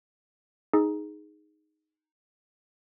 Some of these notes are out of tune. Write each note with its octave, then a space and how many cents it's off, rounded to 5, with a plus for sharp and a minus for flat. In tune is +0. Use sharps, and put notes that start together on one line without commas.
D#4 +0 G#4 +0